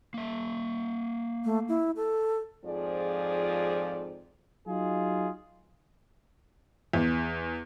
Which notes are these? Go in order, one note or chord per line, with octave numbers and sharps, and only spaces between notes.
A#3 E5
A3
E4
A4
F2 G#2 F3 G#4 D5
F#3 D#4 F4 G#4
E2